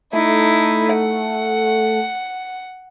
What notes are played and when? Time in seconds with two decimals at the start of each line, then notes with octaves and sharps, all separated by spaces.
0.13 A3 D#4 E4
0.93 F#5